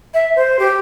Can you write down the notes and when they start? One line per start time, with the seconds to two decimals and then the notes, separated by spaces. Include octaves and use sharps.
0.14 E5
0.36 C5
0.59 G4